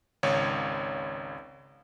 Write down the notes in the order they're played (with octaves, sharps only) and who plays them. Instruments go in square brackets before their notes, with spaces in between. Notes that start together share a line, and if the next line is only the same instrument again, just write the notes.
[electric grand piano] G#1 C#2 C#5